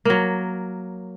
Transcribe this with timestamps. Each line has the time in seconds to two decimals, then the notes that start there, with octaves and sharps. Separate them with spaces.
0.05 F#3 A#3